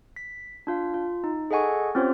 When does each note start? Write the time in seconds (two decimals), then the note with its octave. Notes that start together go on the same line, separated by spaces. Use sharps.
0.16 B6
0.67 D4 F4 F5
0.94 F4
1.24 D#4
1.51 G#4 A4 D#5 F#5 G#5 C#6
1.95 C4 C#4 F4 G4 C5 C#5